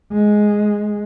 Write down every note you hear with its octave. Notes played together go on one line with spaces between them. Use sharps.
G#3